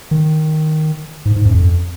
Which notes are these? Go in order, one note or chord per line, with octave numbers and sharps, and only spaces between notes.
D#3
G#2
G#2
F#2
F2